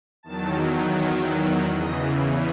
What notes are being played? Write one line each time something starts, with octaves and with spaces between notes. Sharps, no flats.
E2 D#3 F#3 A5
G#5
E5
E2 C#3 E3 D#5